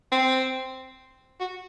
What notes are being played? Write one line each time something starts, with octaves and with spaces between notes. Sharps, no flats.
C4
F#4